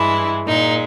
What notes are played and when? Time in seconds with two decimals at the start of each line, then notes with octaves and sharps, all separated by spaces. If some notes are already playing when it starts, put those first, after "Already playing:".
Already playing: G2 E3 G#3 E4
0.46 A#2 G#3 D#4